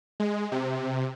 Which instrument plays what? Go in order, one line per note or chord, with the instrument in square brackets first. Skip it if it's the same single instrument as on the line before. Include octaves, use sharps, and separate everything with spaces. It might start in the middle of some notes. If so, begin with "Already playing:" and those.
[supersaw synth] G#3
C3